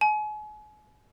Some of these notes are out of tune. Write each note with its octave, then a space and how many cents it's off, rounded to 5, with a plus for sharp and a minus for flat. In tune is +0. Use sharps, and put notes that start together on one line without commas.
G#5 +40